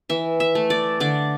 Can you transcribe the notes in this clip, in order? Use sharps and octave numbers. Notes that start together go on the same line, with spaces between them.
E3 E5
E5
A3
D5
D3 D5